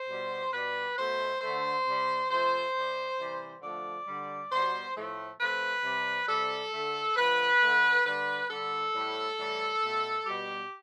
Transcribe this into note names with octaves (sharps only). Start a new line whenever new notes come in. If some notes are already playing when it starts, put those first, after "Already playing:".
Already playing: C5
B2 G3
B2 G3 B4
B2 A3 C5
D3 A3 C5
C3 G3
C3 F3 A3 C5
C3 G3
C3 E3 G3
D3 F3 A3 D5
D3 G3
B2 G3 C5
A2 F3 A3
C3 F3 A3 B4
C3 G3
C3 G3 A4
D3 A3
D3 F3 A3 B4
D3 A3
D3 G3 B4
D3 G3 A4
A2 G3
A2 E3 G3
B2 A3
B2 G3 G4